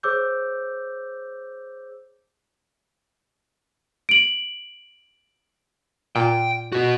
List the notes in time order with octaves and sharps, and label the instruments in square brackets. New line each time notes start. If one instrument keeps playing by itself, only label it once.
[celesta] G#4 C5 C#5 D6 E6 G6
D7 F#7
[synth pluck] A#2 [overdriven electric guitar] G5
[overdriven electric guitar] B3 F#4